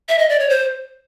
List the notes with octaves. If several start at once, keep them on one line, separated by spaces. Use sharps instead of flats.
E5
D#5
D5
C#5
C5